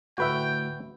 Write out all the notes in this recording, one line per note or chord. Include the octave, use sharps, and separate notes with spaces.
D2 A2 F#4 B4 E5 G5